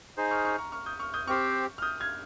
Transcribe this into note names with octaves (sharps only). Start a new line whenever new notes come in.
D#4 G#4 C5
C#6 F6
C#6 F6
A#5 C#6
C#6 F6
D#6 G6
C#6 F6
D#6 G6
C4 G4 C5 C#6 F6
F6
D#6 G6
F6 G#6